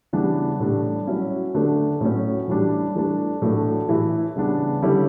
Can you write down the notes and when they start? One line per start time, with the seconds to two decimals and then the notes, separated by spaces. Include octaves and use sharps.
0.13 C#3 E3 G3 B3 D4
0.60 A2 G3 D4
1.07 F#3 C#4 E4
1.54 D3 A3 D4
2.01 A2 F#3 C#4
2.47 A2 E3 G3 D4
2.95 E3 A3 D4
3.42 A2 F#3 A3 D4
3.89 A2 E3 A3 E4
4.36 C#3 G3 B3 D4
4.82 D3 G3 C#4 E4